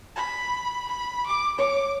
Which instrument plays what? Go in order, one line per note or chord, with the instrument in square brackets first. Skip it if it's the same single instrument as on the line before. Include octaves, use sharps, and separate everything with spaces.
[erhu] B5
B5
D6
[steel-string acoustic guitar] C#5 [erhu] D6